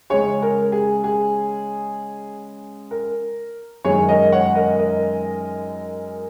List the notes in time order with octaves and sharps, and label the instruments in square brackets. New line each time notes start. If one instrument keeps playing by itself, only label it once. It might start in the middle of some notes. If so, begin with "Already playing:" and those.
[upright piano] C#3 G#3 C#4 G#4 C#5
A#4
G#4
G#4
A#4
F#2 D#3 G#3 G#4 C#5
A#4 D#5
C#5 F#5
A#4 D#5
A#4 D#5